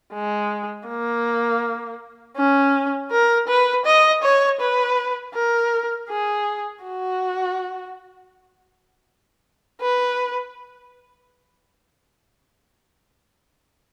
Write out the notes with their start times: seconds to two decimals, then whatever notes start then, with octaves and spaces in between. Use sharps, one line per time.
0.13 G#3
0.88 A#3
2.37 C#4
3.11 A#4
3.48 B4
3.86 D#5
4.23 C#5
4.61 B4
5.34 A#4
6.09 G#4
6.84 F#4
9.81 B4